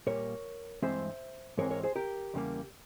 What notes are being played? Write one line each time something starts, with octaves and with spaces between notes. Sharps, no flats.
A#2 G3 A#3 A#4 C#5
G2 E3 G#3 C4 C5 E5
G#2 E3 G#3 C4 A#4 C#5
A#4 C#5
G#4 C5
G4 A#4
E2 C#3 G3 A#3